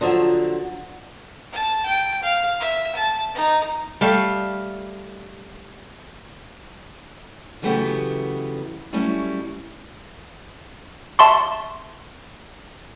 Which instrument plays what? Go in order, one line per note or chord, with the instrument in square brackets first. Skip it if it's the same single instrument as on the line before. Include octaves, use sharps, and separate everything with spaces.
[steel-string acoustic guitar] D3 F3 F#3
[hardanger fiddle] A5
G5
F5
E5
A5
D#4
[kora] G3 A3 F5
[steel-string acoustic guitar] C#3 E3 F#3 A3 B3 G4
F#3 G3 A3 C#4 E4
[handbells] E5 A5 C6 C#6